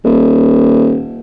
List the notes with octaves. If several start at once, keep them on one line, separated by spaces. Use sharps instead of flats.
D#1